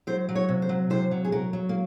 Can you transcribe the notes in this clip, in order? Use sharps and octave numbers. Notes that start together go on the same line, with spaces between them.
F#3 C5
F#3
C#5
C3
C5
F#3
C3 C5
F#3
G#4
F#3 A#4
F#3
A#3